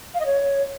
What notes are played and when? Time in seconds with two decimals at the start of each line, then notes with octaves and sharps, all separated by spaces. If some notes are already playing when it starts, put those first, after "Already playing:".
0.14 F5
0.20 D#5
0.25 C#5